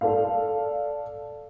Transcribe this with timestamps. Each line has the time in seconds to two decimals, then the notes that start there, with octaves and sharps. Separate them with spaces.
0.01 A4 D5 F5